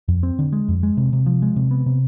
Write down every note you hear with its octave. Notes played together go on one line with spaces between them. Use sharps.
F2
C4
D3
G#3
F2
G#3
C3
C3
F3
G#3
C3
B3
C3